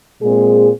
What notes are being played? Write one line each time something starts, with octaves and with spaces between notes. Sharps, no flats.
A#2 G#3 C4 G#4